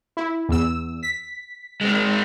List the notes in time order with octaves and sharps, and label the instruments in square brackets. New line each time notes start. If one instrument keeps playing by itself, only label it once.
[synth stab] E4
E2 E6
B6
[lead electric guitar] G#3 C4